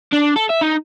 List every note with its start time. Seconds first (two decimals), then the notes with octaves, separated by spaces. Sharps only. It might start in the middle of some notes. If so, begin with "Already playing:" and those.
0.12 D4
0.36 A4
0.50 E5
0.62 D#4